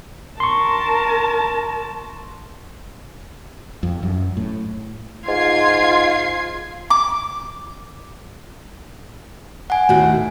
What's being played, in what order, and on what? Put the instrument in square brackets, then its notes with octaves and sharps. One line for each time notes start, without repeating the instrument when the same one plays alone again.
[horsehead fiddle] A#4 A5 [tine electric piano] C6 C#6
[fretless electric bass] F2
F#2
A2
[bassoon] G#2 [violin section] F4 G#6 C7
[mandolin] D6
[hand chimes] F#5 G#5
[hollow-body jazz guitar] D#2 A2 F#4